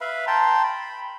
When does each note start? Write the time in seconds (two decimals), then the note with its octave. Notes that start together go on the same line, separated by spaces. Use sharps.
0.01 B4 E5 F5 B5
0.27 G5 A5 A#5 C6
0.63 B5